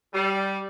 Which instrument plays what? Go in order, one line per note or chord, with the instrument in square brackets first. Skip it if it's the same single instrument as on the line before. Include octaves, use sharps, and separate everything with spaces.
[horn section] G3